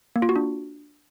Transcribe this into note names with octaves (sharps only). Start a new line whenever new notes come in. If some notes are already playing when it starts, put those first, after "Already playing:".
A#3
F4
F#4
D4